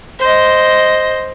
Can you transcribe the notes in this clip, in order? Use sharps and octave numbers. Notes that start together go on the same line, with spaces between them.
C5 D#5